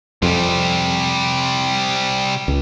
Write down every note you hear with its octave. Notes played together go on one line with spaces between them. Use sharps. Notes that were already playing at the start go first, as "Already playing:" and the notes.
F2 C3 G3
C#2